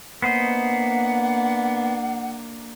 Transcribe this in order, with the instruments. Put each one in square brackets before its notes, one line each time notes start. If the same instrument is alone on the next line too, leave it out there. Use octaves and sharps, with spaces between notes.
[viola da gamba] A#3 D4 [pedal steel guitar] B3 C5 D#5 [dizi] F#5